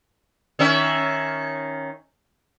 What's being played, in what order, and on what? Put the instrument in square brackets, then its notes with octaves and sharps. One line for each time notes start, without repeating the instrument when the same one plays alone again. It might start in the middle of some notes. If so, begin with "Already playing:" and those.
[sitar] D#3 C#4 E5